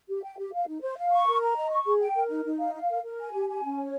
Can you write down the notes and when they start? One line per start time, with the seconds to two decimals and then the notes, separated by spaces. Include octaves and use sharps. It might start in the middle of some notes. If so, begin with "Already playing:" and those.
0.08 G4
0.22 G5
0.38 G4
0.53 F5
0.67 D#4
0.81 C5
0.97 F5
1.11 C#6
1.27 A#4
1.41 A#5
1.56 D#5
1.70 C#6
1.86 G#4
2.01 G5
2.15 A#4
2.30 D#4
2.45 D#4
2.59 F5
2.74 F5
2.89 A#4
3.04 A#4
3.19 G#5
3.33 G4
3.48 G#5
3.63 C#4
3.77 C#5